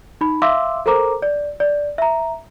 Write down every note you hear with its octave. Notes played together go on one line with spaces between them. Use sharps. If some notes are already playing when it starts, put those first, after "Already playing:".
D#4 B5
E5 F5 C6 D6 E6
A4 A#4 C5 A#5 D6
D5
D5
E5 A#5